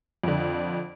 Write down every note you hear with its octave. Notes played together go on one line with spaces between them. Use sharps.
F2 D3